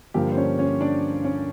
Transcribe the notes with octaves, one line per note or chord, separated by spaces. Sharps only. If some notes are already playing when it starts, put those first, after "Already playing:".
G2 D3 F3 A#3 G4 G5
C5
C#4 C#5
C#4 C#5
D4 D5
C#4 C#5